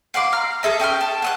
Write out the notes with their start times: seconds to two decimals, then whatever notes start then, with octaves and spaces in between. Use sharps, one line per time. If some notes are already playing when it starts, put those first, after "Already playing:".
0.14 F5 F#5 C6 D6
0.32 F5 A#5 F6
0.63 G#4 A4 E5 A#5
0.80 C#4 G5 C#6 F6
1.01 A5
1.22 F#5 D#6 F#6